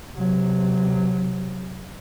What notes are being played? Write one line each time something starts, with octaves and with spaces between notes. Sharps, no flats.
C3 F#3